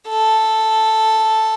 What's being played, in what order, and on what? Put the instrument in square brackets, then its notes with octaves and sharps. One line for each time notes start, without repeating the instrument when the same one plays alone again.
[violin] A4